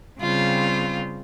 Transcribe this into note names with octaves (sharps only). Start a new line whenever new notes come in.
C#3 G3 C4 F4